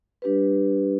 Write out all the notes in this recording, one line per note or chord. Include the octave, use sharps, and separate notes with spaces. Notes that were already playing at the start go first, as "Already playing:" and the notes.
G3 D4 G4 B4